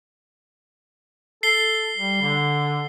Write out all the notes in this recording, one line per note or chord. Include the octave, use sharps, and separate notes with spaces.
A4 C7 G7
G3
D3